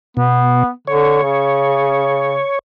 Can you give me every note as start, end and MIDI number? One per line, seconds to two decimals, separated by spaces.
0.17 0.63 47
0.17 0.69 59
0.87 1.21 50
0.87 2.59 73
1.23 2.40 49